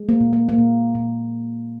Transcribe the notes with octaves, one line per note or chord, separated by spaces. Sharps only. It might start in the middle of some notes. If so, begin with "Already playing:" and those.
Already playing: G#3
A#3
A#2
A#3
A#3
A#2
A#2